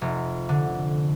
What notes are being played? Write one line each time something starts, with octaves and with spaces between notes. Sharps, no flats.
F1
D3